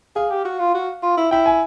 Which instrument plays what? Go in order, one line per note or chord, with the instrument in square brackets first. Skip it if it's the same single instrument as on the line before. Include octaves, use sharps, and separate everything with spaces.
[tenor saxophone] G#4 [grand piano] F5
[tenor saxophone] G4
F#4
F4
F#4
F4
E4
[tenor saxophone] E4 [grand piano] G5
[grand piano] G#5